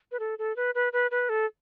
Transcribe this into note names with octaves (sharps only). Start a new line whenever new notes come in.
B4
A4
A4
B4
B4
B4
B4
A4